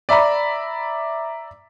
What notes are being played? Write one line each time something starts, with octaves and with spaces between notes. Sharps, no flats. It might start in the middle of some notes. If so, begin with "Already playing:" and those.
D5 E5 A#5 B5